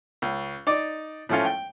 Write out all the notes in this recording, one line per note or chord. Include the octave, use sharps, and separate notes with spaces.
C#2
D#4 D5 D6
A2 F3 A3 C#4 F4
G5